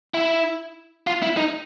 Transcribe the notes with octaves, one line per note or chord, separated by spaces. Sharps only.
E4
F4
E4
D#4